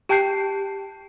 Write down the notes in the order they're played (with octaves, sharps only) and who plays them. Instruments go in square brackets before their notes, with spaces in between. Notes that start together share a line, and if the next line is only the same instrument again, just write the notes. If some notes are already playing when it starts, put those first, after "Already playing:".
[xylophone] G4 G5 A5 F#6 G6 C7